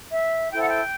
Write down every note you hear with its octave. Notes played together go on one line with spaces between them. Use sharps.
E5
E4 A4 C5 G5
F#5
G5